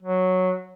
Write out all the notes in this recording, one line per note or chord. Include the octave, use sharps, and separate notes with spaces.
F#3